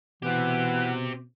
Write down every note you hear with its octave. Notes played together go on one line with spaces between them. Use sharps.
B2 E3 C4 E4 G4 F#5 F#6